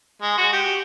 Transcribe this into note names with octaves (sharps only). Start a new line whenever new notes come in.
G#3
F#4
G4